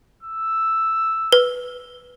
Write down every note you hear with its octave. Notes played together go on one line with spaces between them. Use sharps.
E6
B4